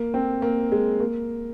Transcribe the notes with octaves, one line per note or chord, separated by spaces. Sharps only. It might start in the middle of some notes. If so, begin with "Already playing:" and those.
Already playing: A#3
C4
A#3
G#3
A#3